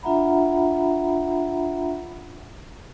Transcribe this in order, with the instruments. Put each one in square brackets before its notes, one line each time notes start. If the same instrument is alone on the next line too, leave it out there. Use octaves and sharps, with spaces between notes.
[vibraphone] D4 F4 E5 F#5 A#5 B5